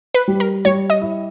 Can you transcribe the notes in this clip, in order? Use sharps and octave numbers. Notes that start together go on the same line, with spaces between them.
B4
G3
A#4
G3 C#5
D#5
E4